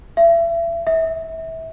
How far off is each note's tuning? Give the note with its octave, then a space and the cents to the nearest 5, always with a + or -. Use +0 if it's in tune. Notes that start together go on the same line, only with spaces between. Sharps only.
E5 +35
E5 -25